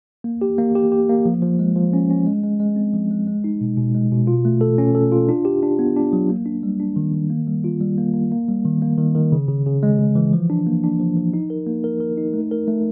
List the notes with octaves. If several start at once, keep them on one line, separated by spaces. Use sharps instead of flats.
A#3
G4
A#3
G4
G4
A#3
F3
F3
G#3
F3
C#4
C#4
G#3
G#3
G#3
C4
F3
G#3
G#3
D#4
B2
B2
G#3
B2
F4
A3
A4
C#4
A4
F4
D4
G4
D4
B3
D4
F#3
A#3
D4
G3
D4
D#3
D#3
A#3
G3
F4
G3
A#3
A#3
A#3
G3
D#3
A#3
D#3
D#3
C#3
C#3
C#3
G#3
C#3
E3
F3
D4
A#3
D4
F3
F3
D#4
A#4
A#3
A#4
A#4
D#4
A3
A#4
A3